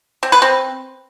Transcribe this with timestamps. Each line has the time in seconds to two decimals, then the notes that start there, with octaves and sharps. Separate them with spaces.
0.23 C4
0.32 B4
0.42 C4